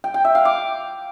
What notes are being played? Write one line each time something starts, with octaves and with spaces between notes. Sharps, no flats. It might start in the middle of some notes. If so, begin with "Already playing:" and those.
G5
G5
E5
F5
D6